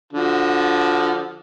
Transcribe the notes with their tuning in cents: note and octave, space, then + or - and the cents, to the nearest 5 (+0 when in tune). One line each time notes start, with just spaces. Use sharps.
D3 -15 F3 +0 F#4 +0